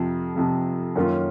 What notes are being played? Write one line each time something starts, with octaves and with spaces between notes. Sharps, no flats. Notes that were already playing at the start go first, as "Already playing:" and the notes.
Already playing: F2 C3 F3
F2 C3 F3
F#2 D#3 A#3 C#4 F4